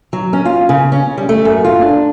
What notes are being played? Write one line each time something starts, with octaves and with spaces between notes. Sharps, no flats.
F#3
C#4
F4
C#3
C#4
G3
A3
F#2
F4
D4